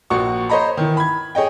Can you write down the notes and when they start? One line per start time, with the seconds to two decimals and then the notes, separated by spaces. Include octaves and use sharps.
0.10 A#1 F#4 F#5 C#6
0.49 C5 C#5 D#5 A#5 B5
0.77 D#3 E3
0.97 B5 G#6
1.35 G#4 C#5 D#5 G5